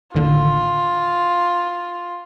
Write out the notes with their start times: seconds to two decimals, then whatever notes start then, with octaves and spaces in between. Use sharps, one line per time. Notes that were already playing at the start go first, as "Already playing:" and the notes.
0.14 A1 D#2 D3 F4